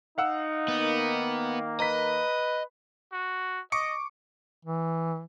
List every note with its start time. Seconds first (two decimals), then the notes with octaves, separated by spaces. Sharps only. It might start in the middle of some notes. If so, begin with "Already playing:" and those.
0.18 D#4 F5 F#5 E6
0.68 D#3 A#3 B3
1.80 B4 D#5 A#5 B6
3.12 F#4
3.72 D#5 C#6 D6 C#7
4.65 E3